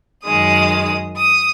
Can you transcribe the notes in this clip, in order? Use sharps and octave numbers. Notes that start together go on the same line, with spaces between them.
F#2 D#3 G#3 D#6
D#6